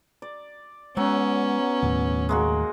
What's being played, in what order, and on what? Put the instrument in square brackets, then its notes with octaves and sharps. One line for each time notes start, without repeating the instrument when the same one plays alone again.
[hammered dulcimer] D5
[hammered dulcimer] F#3 [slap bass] G#3 [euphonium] B3 [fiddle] C#4
[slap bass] D#2 A2
[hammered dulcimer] G#3 A#3 F#4